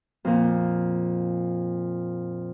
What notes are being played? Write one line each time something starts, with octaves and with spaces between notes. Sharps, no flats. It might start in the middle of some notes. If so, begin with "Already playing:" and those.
F2 A#2